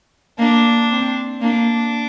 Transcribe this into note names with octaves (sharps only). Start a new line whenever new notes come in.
A#3 D4
C4
A#3 D4